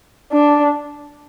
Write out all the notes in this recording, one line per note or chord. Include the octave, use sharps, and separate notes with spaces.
D4